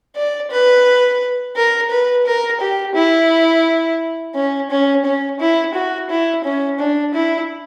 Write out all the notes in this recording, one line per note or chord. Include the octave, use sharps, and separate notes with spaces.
D5
B4
A#4
B4
A#4
G4
E4
C#4
C#4
C#4
E4
F#4
E4
C#4
D4
E4